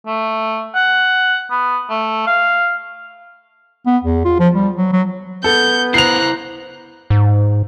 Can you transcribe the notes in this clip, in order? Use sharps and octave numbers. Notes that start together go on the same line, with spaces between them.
A3
F#5
B3
A3
F5
B3
E2
F4
F3
G3
F#3
F#3
B3 A4 G6
E4 C5 A#5 F#6 C7 F7
G#2